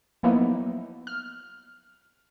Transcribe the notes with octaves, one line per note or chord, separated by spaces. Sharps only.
F3 F#3 A#3 B3 D#4 E4
F6